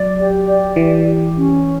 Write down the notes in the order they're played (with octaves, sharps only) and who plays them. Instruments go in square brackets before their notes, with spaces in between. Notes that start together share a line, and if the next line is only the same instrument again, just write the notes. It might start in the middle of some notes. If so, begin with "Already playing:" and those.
Already playing: [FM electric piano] F#3 [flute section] D5
[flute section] G4
D5
[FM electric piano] E3 [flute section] G4
[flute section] G4
C#4